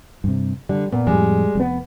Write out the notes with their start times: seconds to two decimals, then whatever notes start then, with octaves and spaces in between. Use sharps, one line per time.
0.24 G2 C3
0.69 D3 G3
0.92 A#2 B3
1.07 F2 A2 G3 G#3
1.55 F1 B3